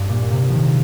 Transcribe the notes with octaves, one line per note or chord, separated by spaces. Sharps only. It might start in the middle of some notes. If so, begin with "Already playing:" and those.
Already playing: G2
A#2
C3
D#3 F3